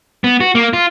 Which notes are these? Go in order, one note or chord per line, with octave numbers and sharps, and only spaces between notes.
B3
F#4
A#3
F4